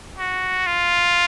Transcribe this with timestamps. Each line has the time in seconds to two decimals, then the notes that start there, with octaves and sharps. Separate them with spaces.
0.18 F#4
0.66 F4